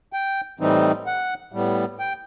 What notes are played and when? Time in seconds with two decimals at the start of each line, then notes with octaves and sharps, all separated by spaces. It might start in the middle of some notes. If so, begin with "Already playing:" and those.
0.13 G5
0.59 A2 E3 G3 C4 D#4
1.06 F#5
1.52 A2 G3 B3
1.99 G5